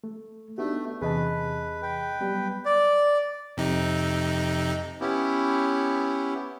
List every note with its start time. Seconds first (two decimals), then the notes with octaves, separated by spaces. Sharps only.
0.04 A3
0.58 A3 B3 D4 D#4 F#4 G4
1.02 E2 C3 G#4 B4 D#5 A5
1.82 B4 G5
2.21 F#3 G3 B3
2.65 D5
3.57 F2 C3 D#4
5.01 B3 C#4 E4 G4